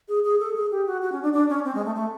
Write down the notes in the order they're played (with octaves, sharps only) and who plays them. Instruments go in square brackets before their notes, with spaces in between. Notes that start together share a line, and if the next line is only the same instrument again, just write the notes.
[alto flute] G#4
G#4
A4
G#4
G4
F#4
F#4
C#4
D4
D4
C#4
C4
G#3
A3
A3